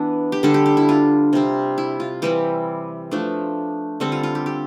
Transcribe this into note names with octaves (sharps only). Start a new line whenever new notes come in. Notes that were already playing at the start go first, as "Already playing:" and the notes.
Already playing: E3 B3 D4 B4
G4
D3 G3 D4 A4
G4
G4
E4
F4
C3 G3 C4
E4
F4
E3 G3 C4 G4
F3 A3 D4
D3 G3 C4 A4
F4
F4
G4
G4